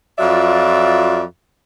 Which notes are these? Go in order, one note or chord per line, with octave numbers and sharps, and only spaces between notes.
F2 F#3 F4 D5 E5